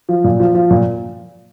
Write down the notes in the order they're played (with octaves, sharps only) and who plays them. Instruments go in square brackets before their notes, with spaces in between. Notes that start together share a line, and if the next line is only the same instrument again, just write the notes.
[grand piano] F3
A#2
F3
F3
A#2